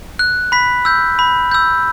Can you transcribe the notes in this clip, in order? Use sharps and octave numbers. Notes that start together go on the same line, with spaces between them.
F#6
B5 B6
E6 G6
B5
E6 G6